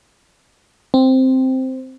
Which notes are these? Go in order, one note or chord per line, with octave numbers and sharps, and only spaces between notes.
C4